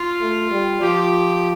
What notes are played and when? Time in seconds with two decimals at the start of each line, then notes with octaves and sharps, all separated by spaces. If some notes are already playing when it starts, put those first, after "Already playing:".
Already playing: F4
0.21 A3
0.51 G3
0.81 F3 G4